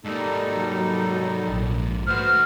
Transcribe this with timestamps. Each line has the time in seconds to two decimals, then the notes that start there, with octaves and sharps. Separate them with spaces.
0.04 G#2 G3 A#3 D#4 A4
0.56 F#3
1.49 A#1
2.07 A3 B3 F#4 C5 F6